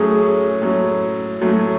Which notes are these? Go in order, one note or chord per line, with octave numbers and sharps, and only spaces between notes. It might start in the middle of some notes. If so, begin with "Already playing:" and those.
Already playing: A2 F#3 A3 C#4 G#4
A2 F#3 A3 C#4
A2 F#3 A3 C#4 F#4